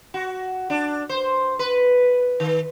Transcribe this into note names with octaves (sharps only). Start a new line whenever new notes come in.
F#4
D4
C5
B4
D#3